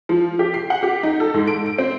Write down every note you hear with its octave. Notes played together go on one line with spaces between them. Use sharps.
F3
G4
C7
F#5
G4
D#4
A4
G#2
D7
D7
C4